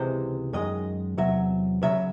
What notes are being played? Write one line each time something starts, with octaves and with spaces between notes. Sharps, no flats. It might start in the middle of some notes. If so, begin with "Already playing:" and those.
Already playing: C#2 C3 E3 G#3 C5
F#2 D#3 G#3 D#5
E2 C3 F#3 E5
C#2 C#3 F#3 E5